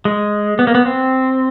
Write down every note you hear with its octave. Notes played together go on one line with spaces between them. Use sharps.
G#3
B3
A#3
B3
C4